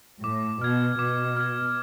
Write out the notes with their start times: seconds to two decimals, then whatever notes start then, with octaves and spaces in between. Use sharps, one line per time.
0.24 A2 D6
0.62 B2 F6 G#6
0.99 B2 D6
1.37 F6 G#6